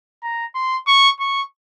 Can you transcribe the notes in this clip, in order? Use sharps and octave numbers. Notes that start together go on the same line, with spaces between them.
A#5
C6
C#6
C#6